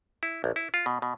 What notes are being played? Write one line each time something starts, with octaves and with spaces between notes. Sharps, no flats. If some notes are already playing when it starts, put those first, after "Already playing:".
E4
A#1
E4
F4
B2
B2